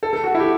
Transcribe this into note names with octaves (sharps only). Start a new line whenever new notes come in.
A4
A4
F#4
E4
G4